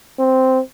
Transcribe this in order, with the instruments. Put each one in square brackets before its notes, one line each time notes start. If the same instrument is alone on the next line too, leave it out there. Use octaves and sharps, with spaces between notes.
[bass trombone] C4